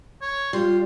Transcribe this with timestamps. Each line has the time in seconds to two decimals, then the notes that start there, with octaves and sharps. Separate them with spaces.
0.21 C#5
0.53 G3 F4 C6